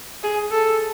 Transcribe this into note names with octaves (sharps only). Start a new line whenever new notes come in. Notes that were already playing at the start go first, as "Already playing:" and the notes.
G#4
A4